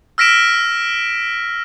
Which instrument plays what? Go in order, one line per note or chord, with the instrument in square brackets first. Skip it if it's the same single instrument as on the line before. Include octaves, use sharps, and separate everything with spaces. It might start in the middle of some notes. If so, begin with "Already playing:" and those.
[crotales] E6 F6 A#6 B6 D7 E7